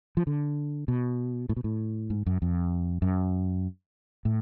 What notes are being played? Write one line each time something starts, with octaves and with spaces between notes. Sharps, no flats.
F3
D3
B2
A2
B2
A2
G#2
F#2
F2
F#2
A2